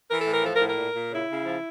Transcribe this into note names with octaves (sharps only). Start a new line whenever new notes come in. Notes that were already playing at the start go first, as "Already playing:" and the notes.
E3 A#4
A4
A2
A#4
F3 A4
A#4
A2
A#4
A#2
A#2
C#3 E4
C#3
F3